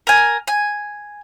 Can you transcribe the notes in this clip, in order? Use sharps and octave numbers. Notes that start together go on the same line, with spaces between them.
A#4 G#5
G#5